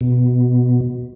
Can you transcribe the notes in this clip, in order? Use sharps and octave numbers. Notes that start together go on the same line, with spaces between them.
B2